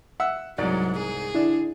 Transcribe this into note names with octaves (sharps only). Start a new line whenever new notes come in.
E5 F#5 E6
C2 G#2 F#3 D5
G#4
D3 D4 E4